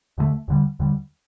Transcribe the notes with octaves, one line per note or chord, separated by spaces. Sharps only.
D#2 D3 F3 A3
D#2 D3 G3
D#2 D3 G3